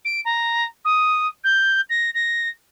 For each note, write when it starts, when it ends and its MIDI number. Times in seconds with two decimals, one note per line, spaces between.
0.05 0.20 98
0.25 0.64 82
0.84 1.27 87
1.44 1.81 91
1.89 2.10 94
2.14 2.48 94